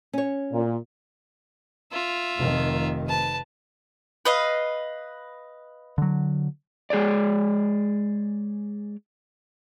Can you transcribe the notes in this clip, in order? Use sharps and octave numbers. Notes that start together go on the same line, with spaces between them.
C#4 C#5
A#2
F4 E5
F1 D#3
B4 A5
B4 D#5 F5
D3 F#3
G#3 G#4 C#5 D5